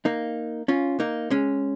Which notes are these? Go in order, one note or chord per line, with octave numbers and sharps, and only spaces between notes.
A#3 D#4
C#4 F4
A#3 D#4
G#3 C#4